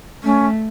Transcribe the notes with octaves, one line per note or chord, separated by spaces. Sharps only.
A3 C#4